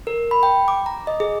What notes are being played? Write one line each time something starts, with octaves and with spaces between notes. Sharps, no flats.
A#4
B5
G5
D6
A#5
D#5
G#4